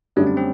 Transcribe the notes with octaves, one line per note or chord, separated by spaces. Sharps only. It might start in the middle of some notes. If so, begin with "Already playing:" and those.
F#2 D3 G3 A3
C4
C4